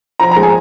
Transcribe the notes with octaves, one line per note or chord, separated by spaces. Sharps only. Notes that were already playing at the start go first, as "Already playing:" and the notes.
F3 A#5
A#5
G#3
G#5